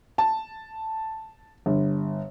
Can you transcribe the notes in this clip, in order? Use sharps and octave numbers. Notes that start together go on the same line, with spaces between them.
A5
G1